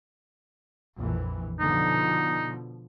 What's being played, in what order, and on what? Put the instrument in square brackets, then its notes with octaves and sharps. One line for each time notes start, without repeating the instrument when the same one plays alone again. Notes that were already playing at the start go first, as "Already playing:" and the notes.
[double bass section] A#1 F2 E3
[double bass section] B2 D3 F3 [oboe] D#4